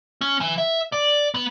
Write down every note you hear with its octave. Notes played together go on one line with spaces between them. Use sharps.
C#4
E3
E5
D5
B3